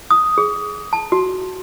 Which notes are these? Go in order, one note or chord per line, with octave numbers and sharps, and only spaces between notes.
D#6
G#4
A5
F#4